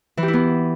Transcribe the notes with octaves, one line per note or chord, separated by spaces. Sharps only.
E3
G4
E4
B3